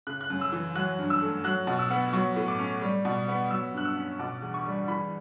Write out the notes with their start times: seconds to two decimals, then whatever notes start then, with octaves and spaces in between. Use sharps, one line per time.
0.07 C#3 F#6
0.21 F#6
0.30 F#2
0.41 E6
0.52 E3
0.75 F#3 F#6
0.99 G2
1.10 E6
1.22 A3
1.44 F#3 F#6
1.67 B2
1.79 E6
1.90 B3
2.13 F#3 C#6
2.36 A2
2.48 D6
2.59 C#4
2.82 G3
3.05 B2
3.28 B3
3.50 F#3 E6
3.74 G2 F#6
3.85 E6
3.97 C#4
4.19 B2 D6
4.42 E2
4.54 C#6
4.66 G3
4.88 E3 B5